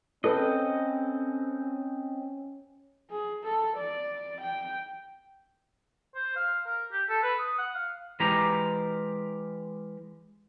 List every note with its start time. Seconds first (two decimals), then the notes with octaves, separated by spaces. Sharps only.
0.24 C4 C#4 A4 B4 D#5
3.11 G#4
3.44 A4
3.77 D5
4.40 G5
6.15 C5
6.36 F5
6.66 A#4
6.92 G4
7.09 A4
7.23 B4
7.39 D#6
7.59 F#5
7.75 F5
8.20 E3 G#3 G4 A#4 A#5